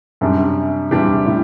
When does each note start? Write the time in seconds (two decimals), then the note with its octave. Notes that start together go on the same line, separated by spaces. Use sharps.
0.21 F#2 C3 G3 D4 G4
0.91 E2 G2 C3 G3 D4 G4
1.26 A2